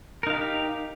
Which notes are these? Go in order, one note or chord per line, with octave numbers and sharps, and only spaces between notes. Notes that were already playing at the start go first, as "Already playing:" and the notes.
D#4 G4 A#4 F5